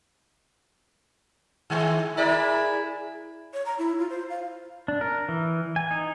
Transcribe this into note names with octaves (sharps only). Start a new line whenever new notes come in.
D#3 G#3
E4 G#4 A#4 D5
C#5
A#5
E4
F4
C5
F5
D4
A#4
E3
G#5
D#4